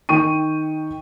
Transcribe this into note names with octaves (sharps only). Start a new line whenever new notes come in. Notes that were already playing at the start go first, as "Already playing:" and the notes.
D#3 D#4 G5 C#6 D#7